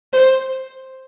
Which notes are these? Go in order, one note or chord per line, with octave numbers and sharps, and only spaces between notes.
C5